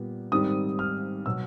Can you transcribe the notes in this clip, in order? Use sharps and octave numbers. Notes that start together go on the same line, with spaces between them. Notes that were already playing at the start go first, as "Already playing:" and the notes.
Already playing: A#2 G3 B3
G#2 D#3 G3 C4 D#6
F6
B2 F#3 E6